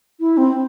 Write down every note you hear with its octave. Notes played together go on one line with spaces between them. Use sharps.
E4
C4